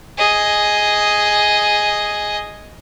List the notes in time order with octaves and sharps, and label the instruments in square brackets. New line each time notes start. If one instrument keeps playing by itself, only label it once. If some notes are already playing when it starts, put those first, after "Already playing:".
[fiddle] G#4 D#5